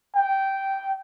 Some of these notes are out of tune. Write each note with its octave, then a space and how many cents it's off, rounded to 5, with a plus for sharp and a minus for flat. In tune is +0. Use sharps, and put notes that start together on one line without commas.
G5 -10